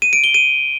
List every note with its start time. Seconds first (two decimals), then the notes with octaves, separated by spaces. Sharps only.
0.02 D#7
0.13 D7
0.24 G7
0.34 D#7